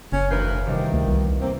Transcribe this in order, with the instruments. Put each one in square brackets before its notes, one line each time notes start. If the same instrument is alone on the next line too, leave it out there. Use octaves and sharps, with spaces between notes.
[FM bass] F#1 [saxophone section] C#4
[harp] E1 G6 C7 [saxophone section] D2 A#4 B4
[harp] C3 E3 G3 [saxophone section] D#3
[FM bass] D2
C2
[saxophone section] C3 A#3 C4